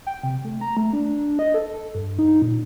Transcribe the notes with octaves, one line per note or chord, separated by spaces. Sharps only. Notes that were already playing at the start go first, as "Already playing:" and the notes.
G5
C3
A3
A#5
A3
D4
D#5
A4
A4
G2
D#4
A#2